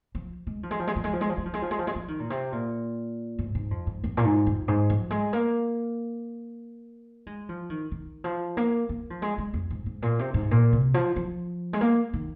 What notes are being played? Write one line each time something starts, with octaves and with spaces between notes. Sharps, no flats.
F3
G#3
F3
G#3
F3
G#3
F3
G#3
F3
G#3
F3
G#3
F3
G#3
F3
G#3
F3
G#3
F3
D#3
A#2
C3
A#2
G#2
G#2
F2
G#2
F2
A#2
G#2
F2
G#2
F3
G#3
A#3
G#3
F3
D#3
D#3
F3
A#3
A#3
F3
G#3
G#3
F2
G#2
G#2
A#2
C3
G#2
A#2
C3
F3
F3
G#3
A#3
D#3